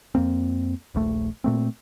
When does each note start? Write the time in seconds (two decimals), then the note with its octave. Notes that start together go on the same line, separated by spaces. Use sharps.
0.15 F2 A#3 C4
0.94 D#1 A#1 A3
1.44 A#2 A3 C4